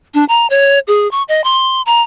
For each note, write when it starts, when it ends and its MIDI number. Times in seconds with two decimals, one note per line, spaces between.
0.14 0.25 62
0.29 0.47 82
0.50 0.79 73
0.87 1.10 68
1.11 1.23 85
1.28 1.43 75
1.44 1.82 84
1.86 2.02 82